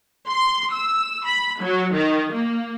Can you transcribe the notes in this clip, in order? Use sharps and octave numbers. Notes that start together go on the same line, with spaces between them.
C6
E6
B5
F#3
D#3
A#3